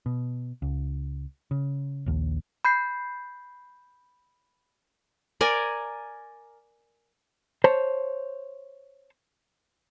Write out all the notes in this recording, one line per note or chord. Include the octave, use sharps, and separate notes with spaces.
B2
C#2
C#3
A#1 D#2
B5 G6 C7
A#4 D5 G#5
C5 C#5 A5